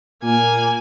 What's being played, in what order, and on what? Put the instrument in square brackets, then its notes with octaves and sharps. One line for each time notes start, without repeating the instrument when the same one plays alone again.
[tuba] A#2 [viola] A#3 G#5